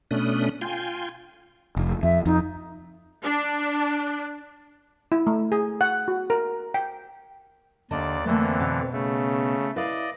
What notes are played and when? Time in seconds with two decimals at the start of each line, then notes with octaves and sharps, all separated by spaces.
0.11 B2 A3 C#4 D4 B5 D#6
0.61 F4 G5 G#5 C6
1.77 F1
2.03 F2 E5
2.26 F2 D#4
3.23 D4
5.12 E4
5.27 A3
5.52 G#4
5.81 F#5
6.08 F#4
6.30 A#4
6.74 G5
7.91 D#2 D3 D5 D#5 A5
8.26 F2 D3 E3 A3 A#3 C4
8.60 B2 B3
8.93 C#3 A3
9.76 E4 B4 D5 D#5 F5